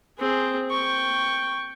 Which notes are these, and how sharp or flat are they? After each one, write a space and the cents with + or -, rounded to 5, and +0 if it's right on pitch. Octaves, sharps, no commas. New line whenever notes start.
C4 +0 G#4 +0
G5 +0 C#6 +0